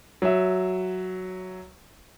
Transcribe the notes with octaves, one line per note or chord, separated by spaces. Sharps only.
F#3 E5